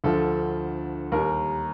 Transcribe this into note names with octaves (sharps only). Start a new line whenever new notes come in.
D2 D3 F3 A4
D#2 D#3 G3 A#4